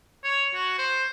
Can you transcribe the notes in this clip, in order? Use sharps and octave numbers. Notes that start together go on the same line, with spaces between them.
C#5
F#4
C5